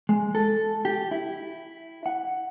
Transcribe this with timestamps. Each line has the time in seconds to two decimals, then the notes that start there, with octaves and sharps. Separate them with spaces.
0.09 G#3
0.35 A4
0.85 G4
1.11 E4
2.06 F#5